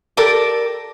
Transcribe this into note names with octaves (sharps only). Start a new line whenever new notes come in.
G4 A4 A#4 D5